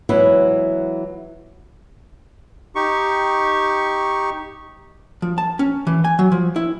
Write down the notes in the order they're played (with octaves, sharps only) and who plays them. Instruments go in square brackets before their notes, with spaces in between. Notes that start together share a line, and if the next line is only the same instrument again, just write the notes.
[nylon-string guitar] E3 F#3 G#3 B3 E4
[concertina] D#4 G4 C#6
[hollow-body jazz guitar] F3
A5
C#4
E3
G#5
F#3
F3
E4